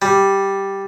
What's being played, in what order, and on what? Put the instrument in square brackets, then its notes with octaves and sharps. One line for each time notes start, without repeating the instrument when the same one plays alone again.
[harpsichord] G3